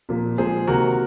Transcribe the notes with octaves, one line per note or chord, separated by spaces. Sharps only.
A#2 F3 A#3
A#2 F3 G#3 G#4 C5
C3 D#3 A#3 F#4 A#4